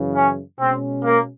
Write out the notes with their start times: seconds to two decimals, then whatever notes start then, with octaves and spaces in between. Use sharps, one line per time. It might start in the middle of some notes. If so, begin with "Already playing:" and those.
Already playing: F#2 C#3 E3
0.15 C#4
0.58 B2 G#3 C4 C#4
1.04 A#3